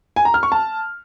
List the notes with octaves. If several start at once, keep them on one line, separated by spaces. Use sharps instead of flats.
G#5
A#5
F6
C#6
A5